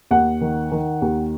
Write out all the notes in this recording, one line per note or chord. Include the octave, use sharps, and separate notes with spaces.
D#2 F#5
D#3
D#3
D#2